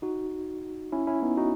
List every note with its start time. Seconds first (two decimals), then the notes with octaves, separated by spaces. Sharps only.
0.02 D#4 F#4
0.92 C#4 E4
1.07 C#4 E4
1.22 B3 D#4
1.37 D#4 F#4